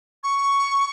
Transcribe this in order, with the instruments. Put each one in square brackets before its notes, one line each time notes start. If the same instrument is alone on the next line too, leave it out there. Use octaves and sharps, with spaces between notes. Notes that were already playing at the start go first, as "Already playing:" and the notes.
[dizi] C#6